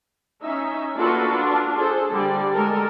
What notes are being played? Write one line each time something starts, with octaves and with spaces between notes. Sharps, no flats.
C#4 D#4 E5
A#3 D4 F4 F#4 A4 B4
D4 F4
G#4 A4 C5
D3 G3 D5
G#3 A4 A#4